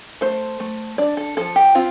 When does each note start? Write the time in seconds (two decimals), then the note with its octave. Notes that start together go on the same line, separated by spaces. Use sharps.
0.21 A3 C5
0.60 A3
0.98 D4 D5
1.17 A4
1.37 F3 A4
1.56 G4
1.75 C4 F4